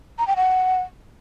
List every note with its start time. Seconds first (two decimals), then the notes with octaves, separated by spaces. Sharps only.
0.19 A#5
0.27 G5
0.36 F#5